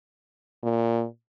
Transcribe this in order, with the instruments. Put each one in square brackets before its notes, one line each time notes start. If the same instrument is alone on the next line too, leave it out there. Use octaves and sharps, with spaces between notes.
[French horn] A#2